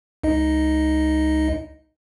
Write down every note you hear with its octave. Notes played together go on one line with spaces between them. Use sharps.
C#2 D#4 D#5